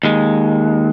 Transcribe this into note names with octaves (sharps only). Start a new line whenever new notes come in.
D#2 G#3